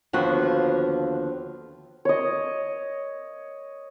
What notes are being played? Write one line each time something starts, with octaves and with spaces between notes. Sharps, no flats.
D#2 D3 F3 B3 F#4
C#5 D#5